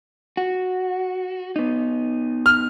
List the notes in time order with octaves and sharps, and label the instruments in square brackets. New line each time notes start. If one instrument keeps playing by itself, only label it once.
[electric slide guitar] F#4
B3 D#4
[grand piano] F6